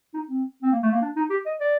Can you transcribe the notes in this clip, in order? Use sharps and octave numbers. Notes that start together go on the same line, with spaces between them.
D#4
C4
C4
A#3
A3
A#3
D4
D#4
G4
D#5
D5